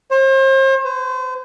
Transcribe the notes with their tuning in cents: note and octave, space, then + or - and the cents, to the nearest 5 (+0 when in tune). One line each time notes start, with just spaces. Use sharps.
C5 +40
C5 -40